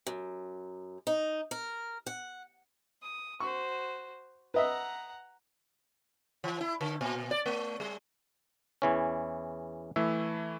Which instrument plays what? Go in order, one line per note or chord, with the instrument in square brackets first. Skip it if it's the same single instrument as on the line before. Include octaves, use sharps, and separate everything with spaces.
[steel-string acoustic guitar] F#2
D#4
A#4
F#5
[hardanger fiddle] D#6
[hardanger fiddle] F#4 C5 [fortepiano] C#6
[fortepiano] B4 D#5 E5 [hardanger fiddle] F#5 A#5
[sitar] E3
E4
D3
A#2
D5
A3
G3
[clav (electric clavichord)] E2 E3 C#4
[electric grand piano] E3 A3 E4 [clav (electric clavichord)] E5